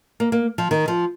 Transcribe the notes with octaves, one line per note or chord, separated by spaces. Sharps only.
A#3
A#3
F3
D#3
F3